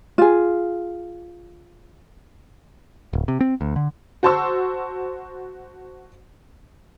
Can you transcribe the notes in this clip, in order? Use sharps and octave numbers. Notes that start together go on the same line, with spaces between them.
F4 G#4
D1
C3
C4
D2
D3
F#4 C5 A5 C6 C#6 E6